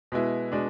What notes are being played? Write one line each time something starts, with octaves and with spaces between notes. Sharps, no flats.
B2 G#3 B3 E4
B2 G#3 D4